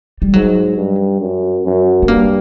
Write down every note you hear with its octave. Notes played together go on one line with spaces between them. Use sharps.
G3
G#2 F#3
G2
F#2
F#2
B3
G2 A#3